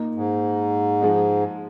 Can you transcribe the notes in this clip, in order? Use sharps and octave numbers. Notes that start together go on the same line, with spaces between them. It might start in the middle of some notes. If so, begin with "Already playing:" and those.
Already playing: A#2 A#3 D#4
G#2
F3 G#3 D#4